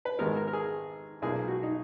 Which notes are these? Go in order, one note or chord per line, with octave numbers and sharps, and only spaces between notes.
B4
G#1 G#2 D#3 G#3 B3 A#4
A#4
A#4
G#4
B1 A#2 A#3 G#4
F#4
D#4